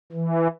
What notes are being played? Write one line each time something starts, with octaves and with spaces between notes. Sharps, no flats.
E3